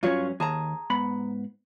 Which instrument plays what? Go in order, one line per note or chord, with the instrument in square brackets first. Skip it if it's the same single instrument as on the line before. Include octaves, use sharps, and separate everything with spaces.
[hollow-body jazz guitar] G2 F#3 C#4 [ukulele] F4 C#5
[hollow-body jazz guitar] D#2 [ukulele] G#4 A5 A#5
[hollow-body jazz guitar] G#2 B3 B5